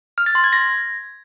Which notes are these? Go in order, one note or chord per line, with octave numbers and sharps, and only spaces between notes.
F6
A6
C6
G#6
A#6